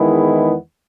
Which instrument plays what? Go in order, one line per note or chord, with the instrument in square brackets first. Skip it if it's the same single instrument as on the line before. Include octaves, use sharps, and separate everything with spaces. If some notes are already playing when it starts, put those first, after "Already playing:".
Already playing: [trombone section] E2 D#3 G#3 B3 E4